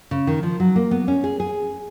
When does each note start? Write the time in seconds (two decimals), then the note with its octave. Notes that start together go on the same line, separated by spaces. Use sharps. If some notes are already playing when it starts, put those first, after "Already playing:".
0.11 C#3
0.27 D#3
0.43 F3
0.60 F#3
0.76 A#3
0.91 B3
1.08 C#4
1.24 G#4
1.40 G#4